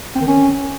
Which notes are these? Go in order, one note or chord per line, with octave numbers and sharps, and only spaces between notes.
C4
D#3
C#4